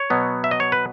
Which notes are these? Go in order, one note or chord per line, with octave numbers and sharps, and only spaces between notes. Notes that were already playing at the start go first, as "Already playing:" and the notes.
Already playing: C#5
B2 F#3 B3
E5
D#5
C#5
B4